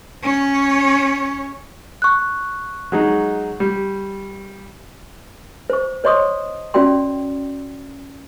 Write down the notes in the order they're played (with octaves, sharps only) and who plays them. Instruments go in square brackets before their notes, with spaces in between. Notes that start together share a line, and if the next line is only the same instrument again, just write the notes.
[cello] C#4 C#5
[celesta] C#6 F#6
[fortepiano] F#3 G#3 D#4
G3
[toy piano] C5 C#6
C5 C#5 D#5 C6 C#6 D#6
C#4 F#4 D5 G5 C6